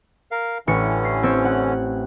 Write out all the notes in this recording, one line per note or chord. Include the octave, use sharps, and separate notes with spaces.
A#4 F5
A1 D3 E3 C#4 C#6 C#7
C7
C4 C#5
F#5